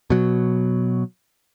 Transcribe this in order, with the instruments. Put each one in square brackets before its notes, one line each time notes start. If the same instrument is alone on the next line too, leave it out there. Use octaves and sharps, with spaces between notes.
[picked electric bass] B2 F#3